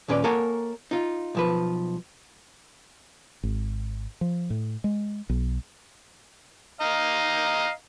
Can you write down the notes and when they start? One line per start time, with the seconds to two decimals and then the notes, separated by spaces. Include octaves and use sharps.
0.08 D#2 A#2 C#4 B4 D5
0.24 A#3 A4 A#4 C#5 F#5 G#5
0.91 D#4 F4
1.35 B1 F3 B4
3.43 G#1
4.21 F3
4.50 A2
4.84 G#3
5.29 B1
6.81 D#5 F5 A#5